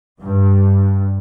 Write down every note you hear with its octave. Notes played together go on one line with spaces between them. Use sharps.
G2